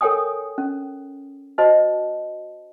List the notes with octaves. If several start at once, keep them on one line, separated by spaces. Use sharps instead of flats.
A4 A#4 C#5 G5 G#5 D#6
C#4
F#4 C5 D#5 A5